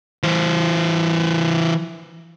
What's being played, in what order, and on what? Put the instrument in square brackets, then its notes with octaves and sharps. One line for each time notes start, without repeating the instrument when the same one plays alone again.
[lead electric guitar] E3 C5